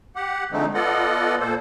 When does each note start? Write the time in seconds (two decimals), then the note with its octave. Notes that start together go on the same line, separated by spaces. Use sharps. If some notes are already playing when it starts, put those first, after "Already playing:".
0.16 G4 F#5
0.52 D3 F3 G#3 A3 C4 D#4
0.74 B3 F4 A4 D5 D#5 F#5
1.40 A#2 A#3 A4 C5